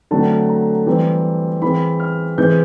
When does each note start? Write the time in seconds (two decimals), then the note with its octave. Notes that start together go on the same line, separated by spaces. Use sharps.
0.11 D3 F#3 A3 C4 A5
0.49 A#5
0.87 E3 G3 C4
1.62 E3 G#3 C4 B5
2.00 F6
2.37 C3 E3 G#3 G6